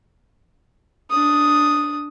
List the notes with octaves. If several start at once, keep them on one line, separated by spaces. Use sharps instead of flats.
D4 D#6